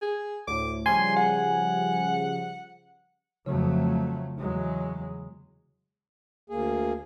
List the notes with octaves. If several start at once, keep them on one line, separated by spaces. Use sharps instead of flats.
G#4
D2 A2 D6
C#3 F3 G3 G#5 C6
F#5
F2 C#3 F#3 A3
E2 F#3 G#3
D2 A#3 G#4